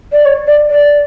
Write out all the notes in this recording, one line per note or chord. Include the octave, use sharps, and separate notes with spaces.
D5
C#5
D5
D5